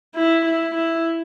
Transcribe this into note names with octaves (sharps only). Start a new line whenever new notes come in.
E4
E4
E4